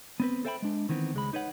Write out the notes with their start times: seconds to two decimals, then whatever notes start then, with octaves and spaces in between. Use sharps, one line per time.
0.20 B3 C4 B4
0.45 A4 C5 E5 G5 G#5 B5
0.62 G#3 D4
0.89 D#3 E3 B3 C4
1.14 C#2 G#3 B5
1.33 D#4 B4 C#5 F#5